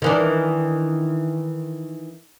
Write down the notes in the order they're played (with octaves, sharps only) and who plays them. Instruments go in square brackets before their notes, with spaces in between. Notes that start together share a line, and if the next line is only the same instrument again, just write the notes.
[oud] D#3 E3 D4